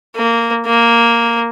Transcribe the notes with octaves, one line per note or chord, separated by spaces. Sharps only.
A#3
A#3